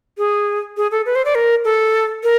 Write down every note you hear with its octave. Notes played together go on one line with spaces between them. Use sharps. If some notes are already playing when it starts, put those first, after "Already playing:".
G#4
G#4
A4
B4
C5
D5
A#4
A4
A#4